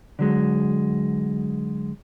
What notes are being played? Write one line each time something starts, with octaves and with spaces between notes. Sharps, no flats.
D3 F#3 G#3